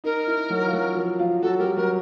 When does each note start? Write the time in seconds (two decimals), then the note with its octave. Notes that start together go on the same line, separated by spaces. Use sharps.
0.04 D#4 A#4
0.27 E4
0.50 F#3 F#4
0.68 F4
0.73 F#3 F#4
0.96 F3 F4
1.19 F3 F4
1.42 F#3 F#4 A4
1.59 G3 G4 A#4
1.77 F#3 F#4 A#4